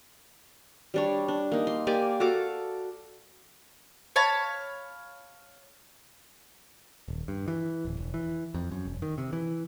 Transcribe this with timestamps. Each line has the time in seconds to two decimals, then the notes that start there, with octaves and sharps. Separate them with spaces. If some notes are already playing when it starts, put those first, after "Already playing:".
0.94 G3 D4 C#5
1.28 D4
1.52 A#3 D#4
1.67 C6
1.87 A#3 G4 D5 G#5
2.20 F#4 A4 F5 D6
4.16 C#5 F5 A5 B5
7.08 D#1
7.28 G2
7.48 E3
7.85 D1
7.99 E1
8.14 E3
8.54 F2
8.71 F#2
8.85 E1
9.02 D#3
9.18 C3
9.33 E3